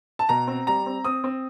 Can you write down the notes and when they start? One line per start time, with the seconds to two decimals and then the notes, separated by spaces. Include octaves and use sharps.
0.19 A5
0.29 B2 A#5
0.47 C4
0.67 G3 A#5
0.86 C4
1.04 C4 D#6
1.24 C4